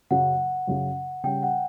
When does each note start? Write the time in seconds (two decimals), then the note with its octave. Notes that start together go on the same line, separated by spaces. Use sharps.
0.11 F#2 C#3 F#3 F#5
0.67 F#2 C#3 F#3
1.24 C#3 G3 C#4 G5
1.43 F#5